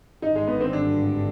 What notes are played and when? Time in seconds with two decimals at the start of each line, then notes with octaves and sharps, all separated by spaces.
0.22 G#1 G2 D3 D#4
0.36 G#3
0.47 B3
0.61 C4
0.73 D4